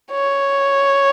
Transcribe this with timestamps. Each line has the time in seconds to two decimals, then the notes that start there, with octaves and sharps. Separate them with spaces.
0.12 C#5